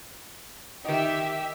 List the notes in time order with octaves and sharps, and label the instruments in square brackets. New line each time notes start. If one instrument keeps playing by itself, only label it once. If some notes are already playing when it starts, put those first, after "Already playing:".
[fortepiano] D#3 D#4 [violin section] G4 E5